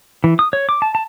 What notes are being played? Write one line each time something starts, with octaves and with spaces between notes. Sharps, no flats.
E3
D#6
C#5
D6
A5
A5